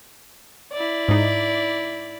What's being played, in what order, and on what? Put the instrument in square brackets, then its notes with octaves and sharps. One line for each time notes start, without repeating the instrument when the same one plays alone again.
[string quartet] E4 D5
[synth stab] G#2 D#4